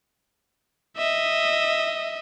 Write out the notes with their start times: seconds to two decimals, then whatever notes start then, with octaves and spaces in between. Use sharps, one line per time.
0.97 D#5 E5